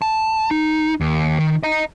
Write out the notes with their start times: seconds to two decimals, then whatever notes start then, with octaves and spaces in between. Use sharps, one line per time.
0.02 A5
0.51 D#4
1.01 D#2
1.39 D#3
1.63 D#5 A#5